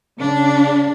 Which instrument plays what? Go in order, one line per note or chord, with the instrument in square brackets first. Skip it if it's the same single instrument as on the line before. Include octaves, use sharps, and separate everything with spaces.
[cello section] C#3 D4